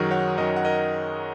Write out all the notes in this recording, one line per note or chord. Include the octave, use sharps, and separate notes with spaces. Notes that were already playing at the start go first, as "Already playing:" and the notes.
Already playing: F#2 D#3 F#3 D#4 F#4 G#4 A#4
C#5 F#5
F#2 D#3 F#3 A#4 D#5
F#5
A#4 D#5